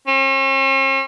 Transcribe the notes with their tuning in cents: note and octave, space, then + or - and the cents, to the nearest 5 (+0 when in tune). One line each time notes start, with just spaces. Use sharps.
C#4 -45